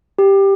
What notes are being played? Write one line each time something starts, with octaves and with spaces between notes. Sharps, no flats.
G4